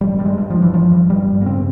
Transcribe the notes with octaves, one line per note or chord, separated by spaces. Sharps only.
G2 G3
G2 G3
G#3
G2
F3
G2
E3
G2 F3
G2
G2 G3
G2
A#3
C#3 C4